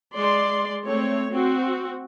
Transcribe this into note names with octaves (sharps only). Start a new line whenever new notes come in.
G#3 D5 C6
A3 C4 C#5
C4 F#4